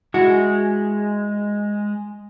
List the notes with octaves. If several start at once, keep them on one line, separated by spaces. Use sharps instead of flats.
G#3 E4 F#4